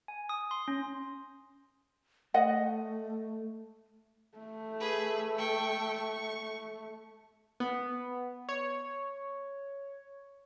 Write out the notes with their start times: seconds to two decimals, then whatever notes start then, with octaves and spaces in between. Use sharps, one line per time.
0.08 G#5
0.29 D#6
0.51 C6
0.68 C#4
2.34 A3 D#5 F#5
4.38 A3
4.80 G#4 B4
5.38 G5 C#6
5.96 C#6
7.60 B3
8.49 C#5